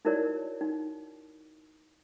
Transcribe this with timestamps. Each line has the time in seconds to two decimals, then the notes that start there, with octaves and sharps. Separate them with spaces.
0.05 D#4 E4 F#4 A#4 C#5 D5
0.61 D#4